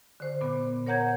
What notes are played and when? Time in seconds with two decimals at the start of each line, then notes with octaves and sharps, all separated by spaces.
0.20 D3 C5
0.41 A#2 B3
0.86 A#4 C#5 F#5 A#5 G6 G#6